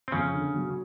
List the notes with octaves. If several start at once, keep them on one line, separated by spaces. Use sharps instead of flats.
C4
F2 C#3 C#4
D3
F#3